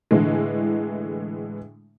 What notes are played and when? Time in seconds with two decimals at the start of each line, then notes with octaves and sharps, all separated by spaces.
0.11 A2 D3 E3 G#3